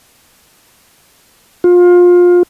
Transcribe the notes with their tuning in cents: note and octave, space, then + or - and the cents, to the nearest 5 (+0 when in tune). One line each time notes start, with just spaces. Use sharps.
F4 +25